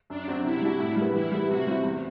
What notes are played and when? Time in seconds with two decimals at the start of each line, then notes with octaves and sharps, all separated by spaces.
0.09 F#2 D4
0.28 F#3 C4 F#4
0.44 C3 E4
0.62 G3 D4 F#4
0.79 A2
0.96 G3
1.02 B3
1.14 E3 E4
1.32 G3 B3
1.48 C3 F#4
1.67 G3 C4 E4
1.83 E2